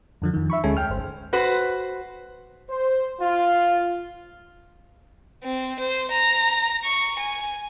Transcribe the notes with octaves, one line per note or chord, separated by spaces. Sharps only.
F2 D3 F3
F2 D#3
E5 B5 C#6
D2 G#3 C#4 A4 G#5
G5 F6
G1 C5
F#4 B4 C5
C5
F4
C4
C5
A#5
C#6
G#5